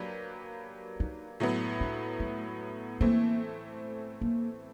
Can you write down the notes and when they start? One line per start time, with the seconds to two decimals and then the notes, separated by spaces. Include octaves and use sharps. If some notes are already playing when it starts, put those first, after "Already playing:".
Already playing: F#3 A#3 D4 G4 B4
1.00 D#4
1.40 A2 F#3 B3
1.81 D4
2.20 A3
3.01 E3 A3 A#3 C4
4.21 A#3